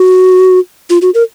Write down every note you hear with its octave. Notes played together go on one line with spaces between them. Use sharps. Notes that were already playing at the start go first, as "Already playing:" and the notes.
Already playing: F#4
F4
F#4
A#4